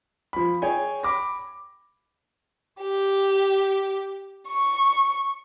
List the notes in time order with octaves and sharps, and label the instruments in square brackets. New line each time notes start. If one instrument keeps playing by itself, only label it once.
[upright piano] F3 B5
G#4 C#5 G5 G#5
B5 D6 A#6
[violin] G4
C#6